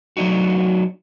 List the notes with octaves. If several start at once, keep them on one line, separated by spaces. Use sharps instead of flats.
F#3 A3 D4 D#4 F#4